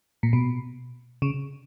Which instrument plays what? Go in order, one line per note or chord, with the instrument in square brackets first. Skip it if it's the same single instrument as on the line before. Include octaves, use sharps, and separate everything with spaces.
[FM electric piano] A#2
B2
C#3